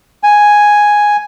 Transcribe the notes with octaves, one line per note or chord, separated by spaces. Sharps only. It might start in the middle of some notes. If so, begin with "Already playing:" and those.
G#5